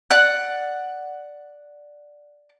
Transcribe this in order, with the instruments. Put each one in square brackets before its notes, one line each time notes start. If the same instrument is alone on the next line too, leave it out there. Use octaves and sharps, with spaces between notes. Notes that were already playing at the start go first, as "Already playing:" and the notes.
[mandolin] D5 F#5 F#6